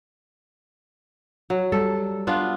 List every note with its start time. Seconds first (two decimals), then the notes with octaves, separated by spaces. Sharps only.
1.50 F#3
1.72 G3 A4
2.27 B3 D4 F4